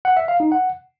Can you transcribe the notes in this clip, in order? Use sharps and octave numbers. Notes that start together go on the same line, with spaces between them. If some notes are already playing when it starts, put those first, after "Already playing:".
F#5
E5
F5
D#4
F#5